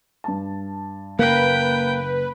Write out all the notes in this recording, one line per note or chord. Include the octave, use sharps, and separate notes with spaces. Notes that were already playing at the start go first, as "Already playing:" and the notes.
G2 A5
F#1 A#3 B4 G5